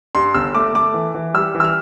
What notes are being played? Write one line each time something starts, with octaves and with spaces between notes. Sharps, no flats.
G2 C6
G1 E6
A3 D6
A3 D6
E3
E3
G3 E6
E3
E6
F6